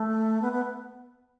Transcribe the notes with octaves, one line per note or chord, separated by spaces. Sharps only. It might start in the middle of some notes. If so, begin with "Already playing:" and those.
Already playing: A3
B3
B3